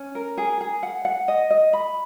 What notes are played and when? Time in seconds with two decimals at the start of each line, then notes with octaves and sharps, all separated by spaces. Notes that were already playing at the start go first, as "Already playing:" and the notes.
Already playing: C#4
0.15 A#4
0.38 G#4
0.61 G#4
0.83 F#5
1.05 F#5
1.28 D#5
1.50 D#5
1.73 B5